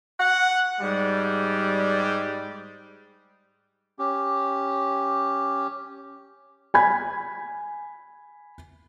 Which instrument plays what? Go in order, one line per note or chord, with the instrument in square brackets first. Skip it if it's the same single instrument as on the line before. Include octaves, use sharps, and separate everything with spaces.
[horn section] F#5
G#2 G3
[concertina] C#4 G4
[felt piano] G#5 B5 G#6